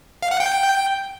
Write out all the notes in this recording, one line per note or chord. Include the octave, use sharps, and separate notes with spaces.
F5
F#5
G5